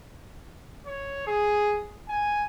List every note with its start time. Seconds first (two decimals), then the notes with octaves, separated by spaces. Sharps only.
0.86 C#5
1.27 G#4
2.09 G#5